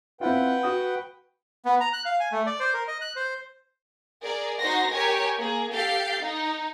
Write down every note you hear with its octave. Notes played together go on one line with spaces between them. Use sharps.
C4 E4 F4 B4 F#5 G5
F#4 D#6
B3
A#5
F#6
F5
G#5
A3
D5
C5
A#4
D#5
F#6
C5
G#4 A#4 D5
D#4 F#4 C5 C6 A#6
G4 A#4 C#5 G#5
A#3 G#4
G4 A4 F5 G6 A6 C7
D#4